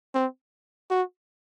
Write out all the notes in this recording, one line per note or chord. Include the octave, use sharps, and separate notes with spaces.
C4
F#4